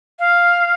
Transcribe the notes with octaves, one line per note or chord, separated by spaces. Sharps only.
F5